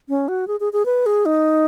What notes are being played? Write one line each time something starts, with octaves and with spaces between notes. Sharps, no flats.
C#4
F#4
G#4
G#4
G#4
B4
G#4
D#4